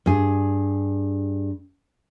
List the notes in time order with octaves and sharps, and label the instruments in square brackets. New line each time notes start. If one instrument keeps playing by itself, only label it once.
[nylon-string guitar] G2 G#4